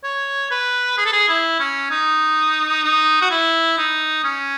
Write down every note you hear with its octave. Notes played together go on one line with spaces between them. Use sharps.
C#5
B4
G#4
A4
G#4
E4
C#4
D#4
D#4
F#4
E4
D#4
C#4